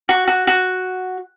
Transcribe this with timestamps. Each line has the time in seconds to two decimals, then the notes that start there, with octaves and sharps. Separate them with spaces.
0.09 F#4
0.27 F#4
0.47 F#4